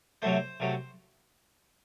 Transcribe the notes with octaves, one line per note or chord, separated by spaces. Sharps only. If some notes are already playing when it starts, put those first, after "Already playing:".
C3 F#3 A3 C5
C3 F#3 A3